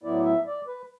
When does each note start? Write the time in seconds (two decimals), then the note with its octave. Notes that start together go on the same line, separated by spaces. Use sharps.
0.04 A2 F#3 B3 E4 D5
0.25 E5
0.46 D5
0.67 B4